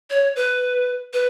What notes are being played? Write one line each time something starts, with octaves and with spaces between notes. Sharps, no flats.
C#5
B4
B4